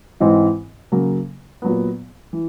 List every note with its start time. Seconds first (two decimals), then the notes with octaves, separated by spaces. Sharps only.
0.20 G#2 E3 G#3 C4
0.92 C#3 F#3 A#3
1.62 A#2 F#3 B3
2.33 E3